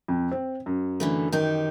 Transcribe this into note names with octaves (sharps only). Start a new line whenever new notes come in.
F2
C4
F#2
D3 E3 A3
D#3 D#4 G4